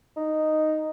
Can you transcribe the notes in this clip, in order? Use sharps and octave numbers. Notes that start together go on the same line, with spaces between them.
D#4